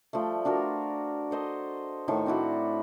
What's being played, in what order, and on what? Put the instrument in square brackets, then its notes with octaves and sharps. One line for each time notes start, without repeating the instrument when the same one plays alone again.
[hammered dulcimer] F3 G3 A3
D4 F#4 A#4 A5
A4 C5 D#5
A2 D#3 A5 C#6
C4 D4 E4 F#4